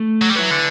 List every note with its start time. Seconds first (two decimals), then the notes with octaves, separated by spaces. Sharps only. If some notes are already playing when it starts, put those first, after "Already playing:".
Already playing: A3
0.22 F#3
0.30 G3
0.36 F#3 E4 B4
0.51 D3